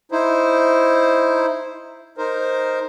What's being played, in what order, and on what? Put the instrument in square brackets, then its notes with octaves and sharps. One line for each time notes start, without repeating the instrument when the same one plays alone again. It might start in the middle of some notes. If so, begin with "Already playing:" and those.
[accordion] D#4 E4 C5
D#4 A#4 C5